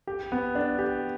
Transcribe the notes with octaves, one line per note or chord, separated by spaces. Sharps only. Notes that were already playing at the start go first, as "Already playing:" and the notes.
G4
B3
D4
G4